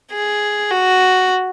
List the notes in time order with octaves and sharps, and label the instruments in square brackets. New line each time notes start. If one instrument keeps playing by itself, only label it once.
[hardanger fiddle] G#4
F#4